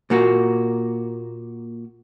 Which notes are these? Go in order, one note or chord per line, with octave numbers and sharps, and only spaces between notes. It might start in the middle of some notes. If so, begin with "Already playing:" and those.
A#2 A#3 F#4